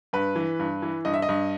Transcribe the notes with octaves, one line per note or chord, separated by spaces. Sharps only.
G2 B4
E3
G2
E3
G2 D#5
E5
D#5
G2